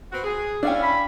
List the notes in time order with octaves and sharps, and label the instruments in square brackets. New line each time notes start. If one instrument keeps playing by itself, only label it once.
[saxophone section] B3 C4 F#4
G#4
[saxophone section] C#4 E4 [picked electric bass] D4 [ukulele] D5 F5 G5
[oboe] B5